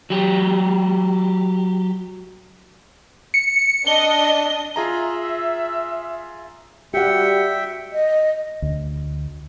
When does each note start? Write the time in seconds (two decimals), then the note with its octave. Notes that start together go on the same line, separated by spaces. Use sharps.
0.10 F#3 G4
3.34 C#7
3.87 D4 D#5 G7
4.76 F4 G#4 E5 A#5
6.94 G3 F#4 G4 E5 F#5 G5 C#7
7.92 D#5
8.62 D2